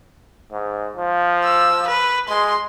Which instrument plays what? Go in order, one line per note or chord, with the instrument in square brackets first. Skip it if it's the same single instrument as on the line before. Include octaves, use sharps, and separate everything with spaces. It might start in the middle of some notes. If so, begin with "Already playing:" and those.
[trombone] G#2
F3
[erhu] E6
B4
[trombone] G#3 [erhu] C6